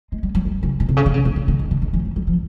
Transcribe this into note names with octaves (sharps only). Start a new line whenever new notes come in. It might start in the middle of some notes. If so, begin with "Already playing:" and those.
G#3
G3
F#3
G3
C#3
B2
C3
C#3
D3
C#3
C3
D3
D3
D#3
D3
D#3
E3
F3
G3
F3